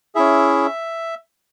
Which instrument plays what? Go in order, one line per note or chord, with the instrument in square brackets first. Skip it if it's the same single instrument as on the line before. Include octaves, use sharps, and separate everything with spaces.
[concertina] C#4 E4 G#4 E5